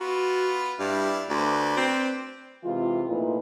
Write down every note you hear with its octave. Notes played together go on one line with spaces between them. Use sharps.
B3 F4 F#4 B5
G2 E4 D5 F5
D2 B4 C5 D5
C4
C3 E3 G#3 F4
A#2 F3 A3 D#4 E4 B4